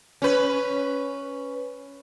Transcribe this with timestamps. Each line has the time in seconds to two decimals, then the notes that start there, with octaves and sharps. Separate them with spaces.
0.22 C#4 B4